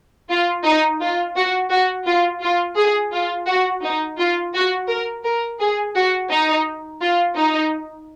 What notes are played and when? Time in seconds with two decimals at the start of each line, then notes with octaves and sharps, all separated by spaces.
0.30 F4
0.64 D#4
1.01 F4
1.36 F#4
1.71 F#4
2.07 F4
2.42 F4
2.77 G#4
3.13 F4
3.47 F#4
3.83 D#4
4.18 F4
4.54 F#4
4.89 A#4
5.24 A#4
5.60 G#4
5.96 F#4
6.31 D#4
7.02 F4
7.37 D#4